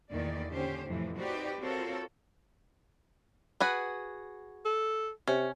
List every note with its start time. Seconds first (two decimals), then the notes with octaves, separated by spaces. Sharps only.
0.11 E2 A#2 D#3 A3 A#3 D5
0.49 A#2 D3 C#4 G4 C5
0.88 F2 A2 C3 E3 F3
1.18 C4 D#4 F#4 G4 B4 D5
1.59 C4 F4 F#4 A4 A#4 C#5
3.60 F#4 G#4 B4
4.65 A4
5.27 C3 C#4